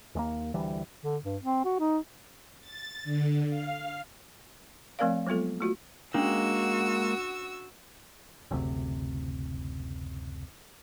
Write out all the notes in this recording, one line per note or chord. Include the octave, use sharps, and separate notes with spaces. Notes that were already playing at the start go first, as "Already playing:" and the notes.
D#2 G#3 A#3
D2 E3 G3
D3
G2
C4
F#4
D#4
A6
D3
F5
F3 A3 C4 A#4 D5 F5
F#3 G#3 B3 F4 A4
A3 F4 F#4
G#3 A#3 C#4 D4 F#4 E6
F#1 D2 C3